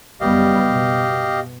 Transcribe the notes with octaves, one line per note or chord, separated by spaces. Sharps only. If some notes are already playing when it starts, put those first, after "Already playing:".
F#1 G3 B3 G4 D#5 F5
B2